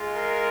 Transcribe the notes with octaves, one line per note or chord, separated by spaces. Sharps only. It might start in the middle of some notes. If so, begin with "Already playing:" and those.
Already playing: G#3 F4
A#4